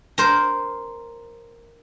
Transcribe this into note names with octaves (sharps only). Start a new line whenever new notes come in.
A#4 C5